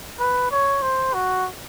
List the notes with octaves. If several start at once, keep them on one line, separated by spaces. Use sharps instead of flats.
B4
C#5
C5
F#4